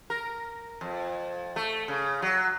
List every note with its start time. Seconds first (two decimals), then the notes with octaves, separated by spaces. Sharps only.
0.10 A#4
0.81 F2
1.56 A3
1.88 C#3
2.22 F#3